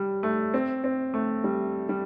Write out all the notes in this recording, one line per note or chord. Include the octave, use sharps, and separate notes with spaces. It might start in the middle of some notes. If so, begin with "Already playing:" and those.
Already playing: G3
A3
C4
C4
A3
G3
G3